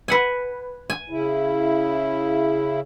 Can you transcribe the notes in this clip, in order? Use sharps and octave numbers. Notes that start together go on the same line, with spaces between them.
B4 F#5 G#5
G#5
C#3 E4